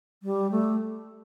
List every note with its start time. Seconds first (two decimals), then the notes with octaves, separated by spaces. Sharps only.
0.23 G3
0.51 A3